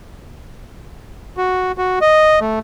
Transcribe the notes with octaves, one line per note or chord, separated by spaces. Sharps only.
F#4
F#4
D#5
A3